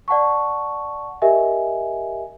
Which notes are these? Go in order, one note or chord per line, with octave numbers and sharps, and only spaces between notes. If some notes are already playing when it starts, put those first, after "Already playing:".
D5 F#5 A5 C#6
G4 A#4 D#5 E5 G#5